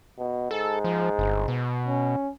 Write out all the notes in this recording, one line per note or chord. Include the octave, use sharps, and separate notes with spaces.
B2
G#2 A4
F3
G1
B2
C#4